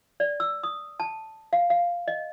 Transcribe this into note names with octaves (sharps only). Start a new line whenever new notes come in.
D5
E6
D#6
A5
F5
F5
D#5